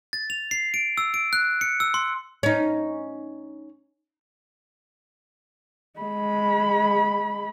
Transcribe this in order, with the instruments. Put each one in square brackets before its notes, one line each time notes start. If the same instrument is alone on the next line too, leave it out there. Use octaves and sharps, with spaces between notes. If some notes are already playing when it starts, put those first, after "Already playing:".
[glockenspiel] A6
F7
C7
D7
E6
D7
F#6
C#7
E6
C6
[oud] C#4 D#4
[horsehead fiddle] G#3 B5